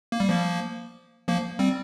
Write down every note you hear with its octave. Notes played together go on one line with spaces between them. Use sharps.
A#3
G3
F3 A#3
F3 A#3
G3 C4